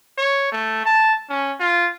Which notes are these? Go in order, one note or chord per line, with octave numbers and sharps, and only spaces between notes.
C#5
A3
A5
C#4
F4